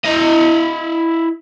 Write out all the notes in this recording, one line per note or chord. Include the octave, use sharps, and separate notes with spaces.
E4 D#5